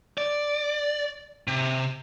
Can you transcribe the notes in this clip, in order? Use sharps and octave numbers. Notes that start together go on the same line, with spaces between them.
D5
C3